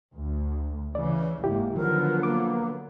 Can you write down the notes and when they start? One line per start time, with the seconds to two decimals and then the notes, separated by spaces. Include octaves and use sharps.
0.14 D2
0.95 C#3 E3 D5
1.44 F#1 G#2 A#3 E4 G4
1.77 D3 D#3 F3 F#3 B3 A#4
2.23 A#3 D6